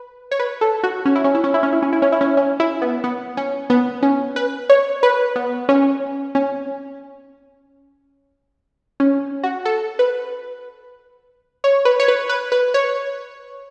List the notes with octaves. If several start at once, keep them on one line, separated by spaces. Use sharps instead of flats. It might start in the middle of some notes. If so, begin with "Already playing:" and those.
Already playing: B4
C#5
B4
A4
F#4
C#4
E4
C#4
E4
C#4
E4
C#4
E4
C#4
E4
C#4
E4
C#4
C#4
E4
B3
B3
C#4
B3
C#4
B4
C#5
B4
B3
C#4
C#4
C#4
F#4
A4
B4
C#5
B4
C#5
B4
B4
B4
C#5